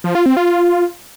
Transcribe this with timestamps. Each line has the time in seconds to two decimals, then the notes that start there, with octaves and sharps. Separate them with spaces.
0.04 F3
0.15 F4
0.26 C4
0.37 F4